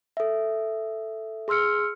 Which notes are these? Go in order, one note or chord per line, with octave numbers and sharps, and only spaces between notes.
A4 E5
G#4 C6 E6 F6 C#7